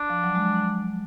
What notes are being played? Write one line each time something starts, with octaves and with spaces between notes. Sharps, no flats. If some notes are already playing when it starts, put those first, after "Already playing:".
Already playing: D4
F3
F#3
G#3